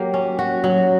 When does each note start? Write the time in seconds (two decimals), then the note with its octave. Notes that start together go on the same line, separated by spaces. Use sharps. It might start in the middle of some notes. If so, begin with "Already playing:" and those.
Already playing: F#3 A#3 G4
0.14 C#4
0.39 F#4
0.64 F#3